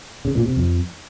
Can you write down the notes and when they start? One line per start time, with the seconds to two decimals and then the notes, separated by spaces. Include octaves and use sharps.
0.25 C#3
0.35 A#2
0.46 C3
0.56 F2